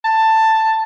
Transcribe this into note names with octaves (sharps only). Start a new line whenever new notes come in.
A5